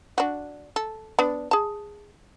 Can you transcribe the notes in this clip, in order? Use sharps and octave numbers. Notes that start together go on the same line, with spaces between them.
D4 F#4
A4
B3 D4
G#4 A5